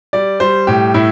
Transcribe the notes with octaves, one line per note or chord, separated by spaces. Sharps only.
G3 D5
G3 C5
A2 G4
A2 E4